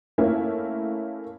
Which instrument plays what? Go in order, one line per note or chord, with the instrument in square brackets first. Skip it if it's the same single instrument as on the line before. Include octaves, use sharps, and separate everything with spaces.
[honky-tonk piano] A3 A#3 C#4 E4